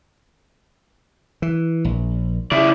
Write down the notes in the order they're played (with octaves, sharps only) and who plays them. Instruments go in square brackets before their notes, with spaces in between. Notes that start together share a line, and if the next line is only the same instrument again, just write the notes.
[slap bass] E3
A#1
[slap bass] C#3 [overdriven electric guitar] E4 D5